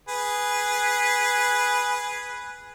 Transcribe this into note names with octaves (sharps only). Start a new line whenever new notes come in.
G#4 B4